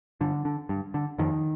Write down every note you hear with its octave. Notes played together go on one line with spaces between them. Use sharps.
G2 D3
D3
G2
D3
F2 D#3